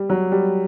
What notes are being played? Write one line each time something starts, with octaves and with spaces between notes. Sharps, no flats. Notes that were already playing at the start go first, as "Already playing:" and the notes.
Already playing: G3
F#3
G3